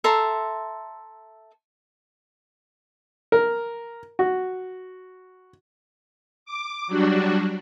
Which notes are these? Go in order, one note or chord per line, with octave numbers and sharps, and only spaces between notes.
A4 E5 A#5 C6
A#4
F#4
D6
F#3 G3 D4 F#4